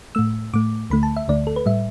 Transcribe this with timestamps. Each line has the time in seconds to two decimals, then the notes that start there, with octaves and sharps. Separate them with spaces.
0.15 A2 A3 E6
0.54 A2 A3 D6
0.90 D2 D3 A3 B5
1.03 A5
1.16 E5
1.28 D2 D3 A3 D5
1.47 A4
1.56 B4
1.66 A2 G3 E5